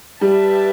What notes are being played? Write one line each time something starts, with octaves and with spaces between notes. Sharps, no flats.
G3 G4 B4 E5 A5